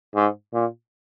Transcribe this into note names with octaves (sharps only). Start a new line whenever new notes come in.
G#2
A#2